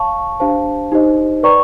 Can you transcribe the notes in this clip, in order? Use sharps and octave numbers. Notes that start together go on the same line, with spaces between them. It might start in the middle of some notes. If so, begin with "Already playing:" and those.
Already playing: C#5 F5 A5 C#6
D4 G4 C5 F5 A5
D#4 G4 C5 D#5
B4 D5 G5 A#5 C#6